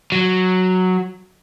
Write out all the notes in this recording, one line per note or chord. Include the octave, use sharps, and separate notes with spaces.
F#3